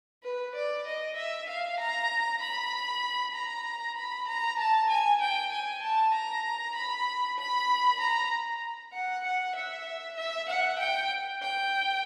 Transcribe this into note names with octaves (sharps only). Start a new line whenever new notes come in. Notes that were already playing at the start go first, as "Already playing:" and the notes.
B4
D5
D#5
E5
F5
A#5
B5
A#5
B5
A#5
A5
G#5
G5
G#5
A5
A#5
B5
B5
A#5
F#5
F#5
E5
E5
F#5
G5
G5